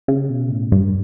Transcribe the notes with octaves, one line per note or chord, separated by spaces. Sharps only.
C#3
B2
A2
G2